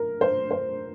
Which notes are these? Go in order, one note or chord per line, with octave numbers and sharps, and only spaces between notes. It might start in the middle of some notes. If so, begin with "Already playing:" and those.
Already playing: A#4
C5
C5